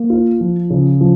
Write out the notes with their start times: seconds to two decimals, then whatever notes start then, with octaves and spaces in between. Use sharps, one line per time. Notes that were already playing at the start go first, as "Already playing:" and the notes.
Already playing: A#3
0.10 F4
0.40 F3
0.70 C#3
1.01 F3